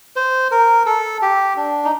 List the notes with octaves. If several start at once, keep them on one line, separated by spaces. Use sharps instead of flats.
C5
A#4
A4
G4
D4
D#4